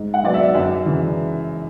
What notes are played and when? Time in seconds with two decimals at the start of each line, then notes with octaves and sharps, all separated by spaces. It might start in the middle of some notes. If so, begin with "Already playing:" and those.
Already playing: G#2
0.14 F#5
0.24 F#3 B3 D5
0.34 E5
0.55 F#2
0.86 C#3 E3